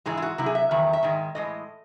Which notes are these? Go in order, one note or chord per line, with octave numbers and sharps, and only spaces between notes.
G#2 E3 G#3 G#4
E4
F#4
C3 F#3 E4
G#4
E5
E2 D#3 F#3 E5
E5
G#2 D#3 G#3
A2 E3 G#3 D#5